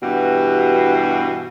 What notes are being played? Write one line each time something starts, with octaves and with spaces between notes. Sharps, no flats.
G2 B2 E3 F#4 G4